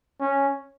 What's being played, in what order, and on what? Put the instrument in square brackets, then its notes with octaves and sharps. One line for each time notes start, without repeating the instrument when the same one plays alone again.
[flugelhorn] C#4